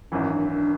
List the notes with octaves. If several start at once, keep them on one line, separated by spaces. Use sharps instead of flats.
G#1 F#2 E3 C#4
D4
D4